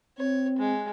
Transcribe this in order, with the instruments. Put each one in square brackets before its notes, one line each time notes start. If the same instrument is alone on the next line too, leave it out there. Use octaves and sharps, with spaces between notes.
[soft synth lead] C4 [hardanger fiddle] C#5
[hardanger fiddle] G#3